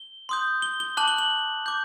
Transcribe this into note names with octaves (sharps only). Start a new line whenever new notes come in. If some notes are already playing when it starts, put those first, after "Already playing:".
Already playing: G7
C6 D#6 G6
G7
G7
A5 D6 F#6 F#7
G7
F#7
D6 G6